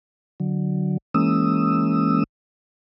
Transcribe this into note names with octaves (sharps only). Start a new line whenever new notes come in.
D3 F#3
E3 G#3 A#3 C#4 D#6 E6